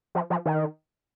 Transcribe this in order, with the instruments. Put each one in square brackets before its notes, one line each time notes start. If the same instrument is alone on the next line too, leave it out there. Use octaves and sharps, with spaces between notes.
[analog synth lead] F3
F3
D#3